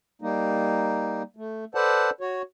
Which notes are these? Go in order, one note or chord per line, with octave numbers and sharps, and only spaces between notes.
G3 A#3 D#4
A3
A4 B4 C5 D5 F#5 A5
F#4 C#5